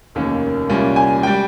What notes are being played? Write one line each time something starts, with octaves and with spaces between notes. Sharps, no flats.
F1 D#2 D#3 A#3 C#4
C2 A#2 G3 A#3 C#4
G#5
G3 G5